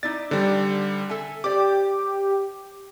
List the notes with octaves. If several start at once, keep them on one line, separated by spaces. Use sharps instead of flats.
D#4 E4 D5 A6
D3 G3 D#4 C5 D5
A4 E5 G#5
G4 C5 D5 D6